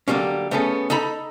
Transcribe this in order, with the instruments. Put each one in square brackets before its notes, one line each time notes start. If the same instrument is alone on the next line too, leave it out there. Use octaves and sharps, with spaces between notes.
[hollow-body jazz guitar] D3 F#3 G3 A#3 C#4
A3 B3 C#4 G#4 A4
D#4 A4 A#5 B5